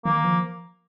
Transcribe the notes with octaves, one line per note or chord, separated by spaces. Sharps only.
D#3 A#3
F3